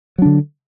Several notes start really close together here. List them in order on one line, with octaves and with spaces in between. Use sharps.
F#3 D4 D3